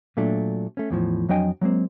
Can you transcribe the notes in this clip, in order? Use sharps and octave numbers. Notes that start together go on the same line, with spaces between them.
A#2 F#3 A3 D4
A3 C#4
E2 A2 F3
F2 F#3 D4 D#5 G5 G#5
F#3 G#3 A#3 C4